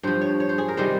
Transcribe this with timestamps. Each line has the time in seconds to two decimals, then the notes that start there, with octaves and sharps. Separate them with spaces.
0.03 G2 F3 C5
0.21 C#5
0.40 C#5
0.49 C5
0.58 G#4
0.68 A#4
0.77 C3 D#3 G3 C5